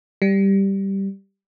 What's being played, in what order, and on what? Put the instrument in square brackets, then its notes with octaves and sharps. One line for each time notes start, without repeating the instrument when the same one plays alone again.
[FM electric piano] G3